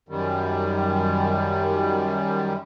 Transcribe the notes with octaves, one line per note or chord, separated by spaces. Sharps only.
F#2 D#3 G3